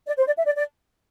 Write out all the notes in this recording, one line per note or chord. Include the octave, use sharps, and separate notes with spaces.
D5
C5
D5
E5
D5
D5